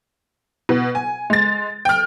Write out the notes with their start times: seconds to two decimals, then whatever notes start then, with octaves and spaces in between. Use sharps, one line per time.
0.69 B2
0.95 G#5
1.30 G#3 A6
1.85 G5 F6